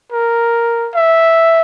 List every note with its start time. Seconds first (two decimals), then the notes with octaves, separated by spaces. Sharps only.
0.12 A#4
0.95 E5